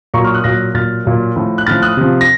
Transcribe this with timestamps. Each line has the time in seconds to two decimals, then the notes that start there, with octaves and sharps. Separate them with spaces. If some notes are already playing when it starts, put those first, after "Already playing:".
0.14 A#2 A#5 C#6
0.17 F#3
0.24 C#6 F6
0.34 D#6 F#6
0.44 A#2 F#3 F#6 A#6
0.74 A#2 F#3 F6 A6
1.05 A#2 F#3
1.36 A2 F3
1.58 F#6
1.66 A2 F3 F6 A6
1.82 D#6 F#6
1.97 C3 F3
2.21 A#6